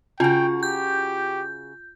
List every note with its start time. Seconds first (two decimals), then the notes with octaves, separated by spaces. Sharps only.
0.20 C#3 F4 F#4 G5
0.63 G4 G6